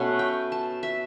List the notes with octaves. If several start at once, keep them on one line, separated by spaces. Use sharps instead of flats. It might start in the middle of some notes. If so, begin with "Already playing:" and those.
Already playing: B2 A3 C#4 F#5
G5
A5
E5